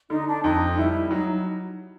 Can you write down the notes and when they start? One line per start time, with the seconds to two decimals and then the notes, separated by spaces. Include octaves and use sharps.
0.10 D3 D#4
0.27 D4
0.43 F2 D#4
0.77 G3 E4
1.11 F#3 D#4